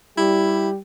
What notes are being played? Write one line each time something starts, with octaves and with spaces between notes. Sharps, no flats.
G3 E4 G4